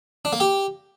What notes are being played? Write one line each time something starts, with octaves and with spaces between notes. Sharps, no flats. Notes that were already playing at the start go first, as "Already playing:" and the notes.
D4
A#3
G4